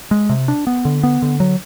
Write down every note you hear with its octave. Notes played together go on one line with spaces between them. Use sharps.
G#3
C3
D4
B3
D3
B3
D3
F#3